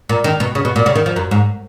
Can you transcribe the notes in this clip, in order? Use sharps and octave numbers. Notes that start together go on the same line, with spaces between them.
A#2
D#3
B2
C#3
B2
A#2
C#3
D#3
F3
F#2
G#2